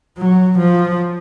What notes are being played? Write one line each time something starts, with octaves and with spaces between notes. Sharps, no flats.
F#3
F3